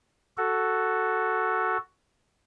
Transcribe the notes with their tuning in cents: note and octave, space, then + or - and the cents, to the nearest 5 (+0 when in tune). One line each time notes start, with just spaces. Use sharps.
F#4 +5 A4 +0